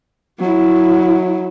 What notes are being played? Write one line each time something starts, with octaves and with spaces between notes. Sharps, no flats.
F#3 E4